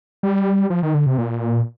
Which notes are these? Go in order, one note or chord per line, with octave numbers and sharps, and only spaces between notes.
G3
F3
D#3
D3
C3
A#2